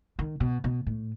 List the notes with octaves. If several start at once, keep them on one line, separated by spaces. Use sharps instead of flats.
D#3
B2
B2
A2